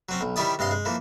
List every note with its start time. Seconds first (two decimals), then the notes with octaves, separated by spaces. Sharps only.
0.09 F#3 C4 C#4
0.21 B1
0.36 D#3 G3 C#4 E4 D5 D#6
0.59 G2 C3 D#5 F5 C6
0.71 G#3
0.85 E3 F3 A#3